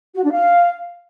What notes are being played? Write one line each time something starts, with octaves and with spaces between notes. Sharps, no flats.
F#4
D4
F5